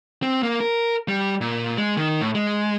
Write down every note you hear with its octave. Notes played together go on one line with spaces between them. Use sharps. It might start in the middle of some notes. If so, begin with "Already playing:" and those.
C4
A#3
A#4
G3
A#2
G#3
D#3
A2
G#3